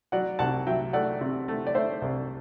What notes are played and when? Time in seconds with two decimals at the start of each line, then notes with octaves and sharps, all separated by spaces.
0.12 F#3 D5 F#5
0.39 C2 F#5 A5
0.67 F#3 E5 G5
0.93 A3 D5 F#5
1.21 C3
1.48 A3
1.67 D5
1.75 A3 C5 E5
2.02 C2